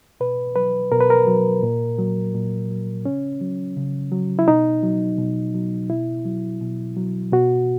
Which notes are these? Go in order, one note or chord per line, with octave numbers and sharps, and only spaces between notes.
B2 B4
F#3 B4
B2 A#4
B4
A#4
F#3
A#2
F#3
A#2
F#3
C#3 C#4
F#3
C#3
F#3
E4
B2 D#4
F#3
B2
F#3
B2 E4
F#3
B2
F#3
B2 F#4